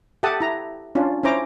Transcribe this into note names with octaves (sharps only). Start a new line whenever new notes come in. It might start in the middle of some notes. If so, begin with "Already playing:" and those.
G4 A4 E5 F#5 A5 D#6
E4 A#5
C#4 D4 F4
C#4 E4 C5 A#5 D6